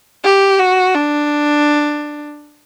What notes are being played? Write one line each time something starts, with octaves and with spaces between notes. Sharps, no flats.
G4
F#4
D4